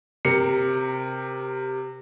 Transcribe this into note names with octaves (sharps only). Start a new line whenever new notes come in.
C3 A#4 C#7